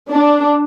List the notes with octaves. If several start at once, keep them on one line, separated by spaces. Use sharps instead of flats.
D4